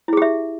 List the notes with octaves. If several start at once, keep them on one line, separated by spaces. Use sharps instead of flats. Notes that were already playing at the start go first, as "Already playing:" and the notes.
E4 G4 G#4 E5